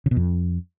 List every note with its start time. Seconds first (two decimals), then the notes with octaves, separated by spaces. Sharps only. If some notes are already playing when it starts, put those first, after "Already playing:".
0.06 C#3
0.11 B2
0.16 F2